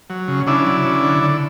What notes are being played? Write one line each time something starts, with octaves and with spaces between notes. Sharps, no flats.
F#3
C#3
C#3 D4 E4
F#3
C#3
D3
D3